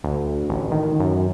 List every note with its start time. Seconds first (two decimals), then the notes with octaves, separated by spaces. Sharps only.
0.04 D2
0.50 A1
0.71 D#3
0.99 F#2